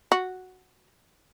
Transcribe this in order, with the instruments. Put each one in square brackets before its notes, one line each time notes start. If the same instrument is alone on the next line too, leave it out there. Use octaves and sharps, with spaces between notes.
[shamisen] F#4